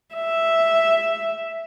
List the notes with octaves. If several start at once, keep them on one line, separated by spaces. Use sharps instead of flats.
E5